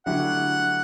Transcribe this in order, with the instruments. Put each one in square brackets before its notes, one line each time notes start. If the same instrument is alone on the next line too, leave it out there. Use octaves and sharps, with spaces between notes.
[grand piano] D3 F#3 A3 E4 G4 [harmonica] F#5